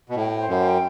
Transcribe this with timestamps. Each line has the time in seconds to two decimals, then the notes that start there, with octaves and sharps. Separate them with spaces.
0.09 B2
0.16 A2 G5
0.38 C5
0.48 F#2
0.60 G5